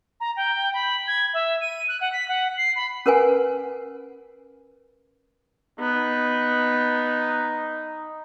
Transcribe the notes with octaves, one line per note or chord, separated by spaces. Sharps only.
A#5
G5
B5
G#6
E5
D#7
F#6
F#5
B6
F#5
C7
B5
C#4 A#4 B4 F#5 G#5
B3 D#4